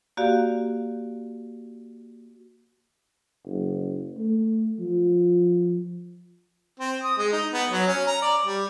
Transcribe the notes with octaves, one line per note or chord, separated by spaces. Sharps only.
A#3 F#4 G4 D5 F5
F#1
A3
F3
C4
D#6
G#3
D#4
B3
F#3
C#4
A#5
D5
G3